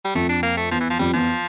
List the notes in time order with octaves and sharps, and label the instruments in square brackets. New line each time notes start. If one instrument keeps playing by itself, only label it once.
[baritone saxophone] G3
[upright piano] F2 [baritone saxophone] A3
[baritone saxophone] D4
A#3
A3
[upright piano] E2 [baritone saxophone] F3
[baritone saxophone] E3
F3
[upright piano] F2 [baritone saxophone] G3
[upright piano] E2 [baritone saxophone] F3